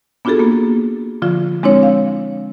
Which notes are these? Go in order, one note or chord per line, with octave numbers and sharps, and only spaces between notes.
B3 D4 F4 F#4 G#4 A4
A#3 B3
D3 F3 F4
G#3 C4 D4 E4 C#5
F5